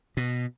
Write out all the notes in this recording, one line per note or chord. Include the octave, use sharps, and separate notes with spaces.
B2